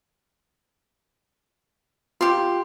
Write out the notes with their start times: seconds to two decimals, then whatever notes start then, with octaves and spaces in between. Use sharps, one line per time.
2.21 F4 G4 G5 C6